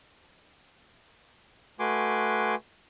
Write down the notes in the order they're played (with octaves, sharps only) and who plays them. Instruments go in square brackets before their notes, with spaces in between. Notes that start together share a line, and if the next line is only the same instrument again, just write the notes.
[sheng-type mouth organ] A3 F#4 B4 G#5 C6 D6